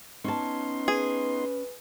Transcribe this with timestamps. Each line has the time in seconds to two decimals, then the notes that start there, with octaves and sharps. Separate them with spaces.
0.24 B3 C#4 D#4 A5 C6
0.88 G#4 B4